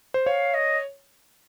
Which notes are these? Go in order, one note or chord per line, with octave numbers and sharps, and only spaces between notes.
C5
C#5 F5
D#5